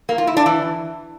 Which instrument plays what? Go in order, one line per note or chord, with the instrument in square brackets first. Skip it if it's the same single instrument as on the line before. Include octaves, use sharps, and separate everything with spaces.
[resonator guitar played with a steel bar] A#3
F4
E4
D4
E3